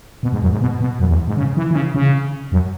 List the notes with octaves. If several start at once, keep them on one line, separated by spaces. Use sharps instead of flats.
B2
G#2
F#2
G#2
B2
B2
F#2
E2
G#2
C#3
E3
E3
C#3
C#3
F#2